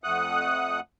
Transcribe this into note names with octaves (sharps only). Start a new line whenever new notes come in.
F2 A3 F#5 D#6 F#6